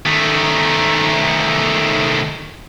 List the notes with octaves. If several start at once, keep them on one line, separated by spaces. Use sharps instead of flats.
D#3 A3